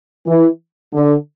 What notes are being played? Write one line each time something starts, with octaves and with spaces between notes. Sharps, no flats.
E3
D3